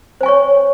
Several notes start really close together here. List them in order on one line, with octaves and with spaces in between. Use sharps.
C5 G#5 C#6 C#5